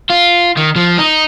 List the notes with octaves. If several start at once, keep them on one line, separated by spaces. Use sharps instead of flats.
F4
D#3
F3
D#4